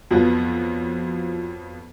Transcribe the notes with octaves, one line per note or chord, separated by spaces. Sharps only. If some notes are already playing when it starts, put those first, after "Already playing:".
F2 F3 F#3 B3 F4